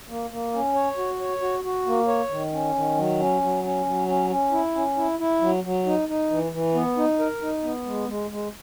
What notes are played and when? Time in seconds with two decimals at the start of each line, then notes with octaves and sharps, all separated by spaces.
0.08 A#3
0.31 A#3
0.53 C#4
0.75 C#5
0.97 F#4
1.20 C#5
1.42 F#4
1.64 F#4
1.86 A#3
2.08 C#5
2.30 D#3
2.53 C#4
2.75 D#3
2.97 F#3
3.19 C#4
3.42 F#3
3.64 C#4
3.86 F#3
4.08 C#4
4.30 C#4
4.52 E4
4.75 C#4
4.97 E4
5.19 E4
5.41 F#3
5.64 F#3
5.86 D#4
6.09 D#4
6.31 E3
6.52 E3
6.75 B3
6.97 D#4
7.19 A#4
7.42 D#4
7.63 B3
7.86 G#3
8.08 G#3
8.30 G#3